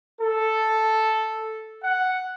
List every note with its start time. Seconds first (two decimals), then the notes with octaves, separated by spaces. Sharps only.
0.20 A4
1.83 F#5